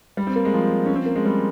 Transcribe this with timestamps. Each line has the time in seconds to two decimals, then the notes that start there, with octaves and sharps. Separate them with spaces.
0.17 G3
0.27 C4
0.36 A#3
0.45 G#3
0.54 F3
0.86 C#4
0.96 C4
1.06 A#3
1.16 G#3
1.26 G3